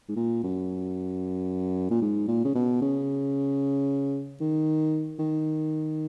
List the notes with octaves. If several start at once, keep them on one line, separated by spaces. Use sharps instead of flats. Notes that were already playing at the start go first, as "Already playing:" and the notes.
G#2
A#2
F#2
A#2
G#2
A#2
C#3
B2
C#3
D#3
D#3